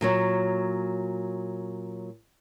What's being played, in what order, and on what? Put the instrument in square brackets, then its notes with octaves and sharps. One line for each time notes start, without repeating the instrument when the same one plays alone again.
[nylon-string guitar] A#2 F#3 C#5